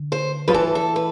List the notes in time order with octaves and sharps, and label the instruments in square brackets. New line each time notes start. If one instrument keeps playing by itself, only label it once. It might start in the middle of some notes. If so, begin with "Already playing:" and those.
Already playing: [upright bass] D3
[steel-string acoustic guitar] C5
[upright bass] F3 [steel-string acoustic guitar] B4
[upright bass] E3 [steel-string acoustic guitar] A4
[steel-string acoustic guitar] A4
B4